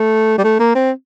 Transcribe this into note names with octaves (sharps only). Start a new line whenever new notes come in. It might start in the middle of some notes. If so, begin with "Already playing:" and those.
Already playing: A3
G3
A3
A#3
C4